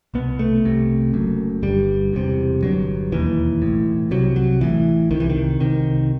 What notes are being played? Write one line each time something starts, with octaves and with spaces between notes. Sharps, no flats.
C2 B2 B3
A3
C2 C3
F#1 F#2
G1 G2 G3
E1 E2 C3
G1 G2 F#3
E1 D#2 E3
B1 A2
C2 C3 F#3
F#3
A1 A2 E3
C2 C3 D#3
E3
D#3
C2 C3 D#3